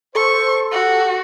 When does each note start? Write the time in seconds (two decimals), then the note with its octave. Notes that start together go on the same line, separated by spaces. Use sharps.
0.15 A4 C5 C#6
0.72 F#4 G4